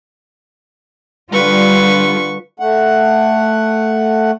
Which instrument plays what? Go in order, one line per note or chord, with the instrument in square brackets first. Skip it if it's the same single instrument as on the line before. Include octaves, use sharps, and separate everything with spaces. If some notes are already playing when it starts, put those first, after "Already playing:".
[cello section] D3 G3 F4 [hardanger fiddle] B4 C#6
[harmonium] A3 F#5